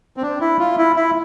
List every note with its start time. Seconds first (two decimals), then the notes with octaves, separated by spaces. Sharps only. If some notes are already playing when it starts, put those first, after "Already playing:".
0.17 C4
0.22 D4
0.41 E4
0.59 F4
0.78 E4
0.96 E4